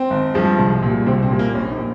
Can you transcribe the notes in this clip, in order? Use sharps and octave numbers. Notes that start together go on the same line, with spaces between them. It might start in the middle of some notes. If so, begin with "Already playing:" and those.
Already playing: C4
G#1
G2 F3 G#3
C2
A#2 G3
C2 C4
C4
A#2 G3
A#3
A#1 C#4
D#4
A#2